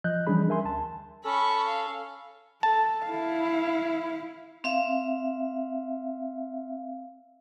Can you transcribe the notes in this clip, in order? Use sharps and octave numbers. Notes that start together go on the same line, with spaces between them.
F3 D#5 F#6 G6
E3 G3 C#4 D4 G#4 B5
A#4 E5 G#5 C6
D2 A5
C#4 A4 B5 C#6
F5
A4 A5
E4 F5
C4 E5 F5